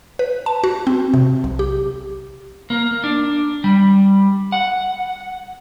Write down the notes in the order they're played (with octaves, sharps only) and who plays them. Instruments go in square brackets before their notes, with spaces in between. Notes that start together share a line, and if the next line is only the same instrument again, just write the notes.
[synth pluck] B4
A5
F#4
C4
C3
B1
G4
[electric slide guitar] A#3
D4
G3
F#5